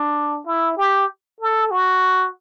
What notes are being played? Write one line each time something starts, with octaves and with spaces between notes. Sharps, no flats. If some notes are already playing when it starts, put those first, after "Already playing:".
Already playing: D4
E4
G4
A4
F#4